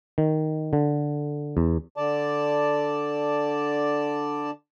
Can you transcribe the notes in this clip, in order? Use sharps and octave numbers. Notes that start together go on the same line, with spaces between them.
D#3
D3
E2
D3 D5 A5